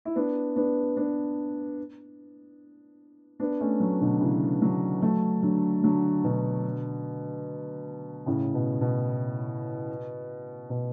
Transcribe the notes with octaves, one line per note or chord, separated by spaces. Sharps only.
E4
B3 D4
B3 D4
B3 D4
B3 D4
A3 C#4
F#3 A3
B2 D3
C#3 E3
D3 F#3
F#3 A3
D3 F#3
D3 F#3
B2 D3
A2 C#3
B2
B2
B2